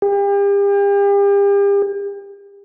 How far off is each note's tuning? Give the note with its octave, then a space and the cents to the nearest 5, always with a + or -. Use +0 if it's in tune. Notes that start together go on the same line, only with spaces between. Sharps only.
G4 +40